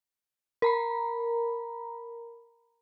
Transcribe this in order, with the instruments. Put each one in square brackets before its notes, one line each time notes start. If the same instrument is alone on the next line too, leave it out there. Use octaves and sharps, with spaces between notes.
[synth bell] A#4 A#5 B5